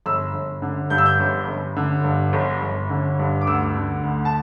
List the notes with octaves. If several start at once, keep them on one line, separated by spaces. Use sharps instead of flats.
G1 E6
G1
D3
G2 G6
E6
G6
G1
G1
D3
G2
G1
G1
D3
G2
D6
D2 E6
D3
D2
A5